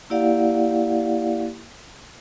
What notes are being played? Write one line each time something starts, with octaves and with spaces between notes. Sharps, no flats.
A#3 E4 G4 D5 F5 F#5